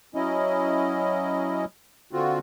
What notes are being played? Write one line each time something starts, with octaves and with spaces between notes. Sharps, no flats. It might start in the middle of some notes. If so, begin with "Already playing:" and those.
F#3 C#4 E4 D#5
D3 C4 F4 F#4